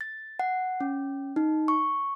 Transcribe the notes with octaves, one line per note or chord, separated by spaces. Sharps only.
A6
F#5
C#4
D#4
C#6